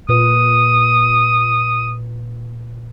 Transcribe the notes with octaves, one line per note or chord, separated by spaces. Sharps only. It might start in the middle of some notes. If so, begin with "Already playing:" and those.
A#2 B4 D#6